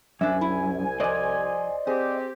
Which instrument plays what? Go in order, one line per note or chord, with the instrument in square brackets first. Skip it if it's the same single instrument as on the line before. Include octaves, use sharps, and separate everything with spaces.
[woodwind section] C2 G#5 [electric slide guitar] F#2 [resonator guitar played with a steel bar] D4 E5
[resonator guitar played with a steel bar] E4
[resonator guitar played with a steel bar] F2 G#2 [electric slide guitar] C5 D5 D#5
[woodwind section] C4 G4 [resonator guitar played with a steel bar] G#4